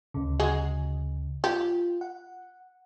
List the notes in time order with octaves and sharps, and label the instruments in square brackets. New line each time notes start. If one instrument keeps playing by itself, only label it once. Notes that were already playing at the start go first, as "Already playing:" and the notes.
[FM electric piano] D2 C#3
[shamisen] F#3 G#3 G#4
[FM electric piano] F4 [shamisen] G4
[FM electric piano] F#5